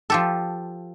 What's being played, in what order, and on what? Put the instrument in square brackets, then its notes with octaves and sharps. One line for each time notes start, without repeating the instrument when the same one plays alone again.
[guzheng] F3 G4 A4